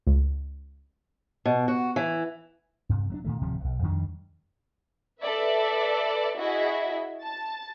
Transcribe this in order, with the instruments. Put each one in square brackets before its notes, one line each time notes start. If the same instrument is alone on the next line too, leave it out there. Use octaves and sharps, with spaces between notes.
[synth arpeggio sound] C#2
[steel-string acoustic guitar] B2
F#4
E3
[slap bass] G2 C3
F#3 A#3 D4
A#2 D#3 A3
D1 C3 F3 G3
B1
F2 D#3 G3 D4
[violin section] A4 B4 D5 E5
E4 F#4 G#4 D#5 E5
A5 A6